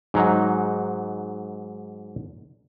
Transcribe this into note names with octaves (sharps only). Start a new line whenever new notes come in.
G#2 F#3 D#4